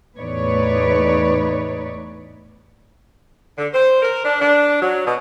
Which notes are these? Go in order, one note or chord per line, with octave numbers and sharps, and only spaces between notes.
E2 A2 D#4 B4 C#5 D5
D3
C5
A#4
D4
D4
F#3
B2